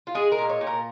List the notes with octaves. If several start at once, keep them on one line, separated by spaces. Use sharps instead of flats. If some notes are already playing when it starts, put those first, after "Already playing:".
F4
G#3 G#4
A#4
A#2
C#5
A#2
A#4